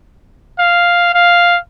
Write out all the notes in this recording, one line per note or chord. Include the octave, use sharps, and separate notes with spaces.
F5
F5